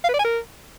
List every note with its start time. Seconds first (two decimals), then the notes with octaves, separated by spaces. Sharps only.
0.04 F5
0.09 B4
0.14 D5
0.19 G#5
0.24 A#4